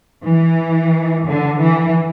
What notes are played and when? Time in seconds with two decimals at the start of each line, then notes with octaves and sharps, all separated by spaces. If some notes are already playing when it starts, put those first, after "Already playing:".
0.25 E3
1.27 D3
1.61 E3